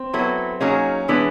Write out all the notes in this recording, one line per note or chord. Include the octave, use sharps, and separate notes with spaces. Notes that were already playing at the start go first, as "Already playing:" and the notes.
Already playing: C4
F#3 B3 E4 A4
F#3 A#3 C#4 D#4 G#4
E3 G#3 B3 D4